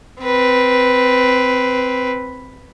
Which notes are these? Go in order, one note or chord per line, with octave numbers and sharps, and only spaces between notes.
C4 B4